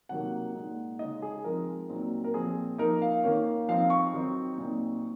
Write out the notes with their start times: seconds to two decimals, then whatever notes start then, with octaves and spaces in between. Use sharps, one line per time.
0.09 C3 D#3 F#3 A#3 F#5
0.55 A#2 G#3 D#4
0.99 C#3 G#3 D#4 D#5
1.22 G#4
1.44 F3 G#3 C4 D#4 A#4
1.89 A#2 F#3 C4 D#4
2.24 A#4
2.34 A#2 F3 C4 G#4
2.78 F3 A#3 D#4 A#4
3.02 F5
3.24 D#3 A#3 C#4
3.68 F3 C4 D#4 F5
3.90 C#6
4.13 D#3 F#3 C4 D#4
4.58 A#2 F#3 C4 D#4